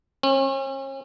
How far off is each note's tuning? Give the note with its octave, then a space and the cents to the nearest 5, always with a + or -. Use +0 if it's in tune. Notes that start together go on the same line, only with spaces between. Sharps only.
C#4 -40